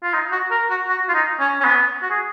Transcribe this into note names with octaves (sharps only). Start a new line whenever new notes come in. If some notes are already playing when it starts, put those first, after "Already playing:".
F4
D#4
F#4
A#4
F#4
F#4
F4
D#4
C#4
C#4
B3
F#4
G#4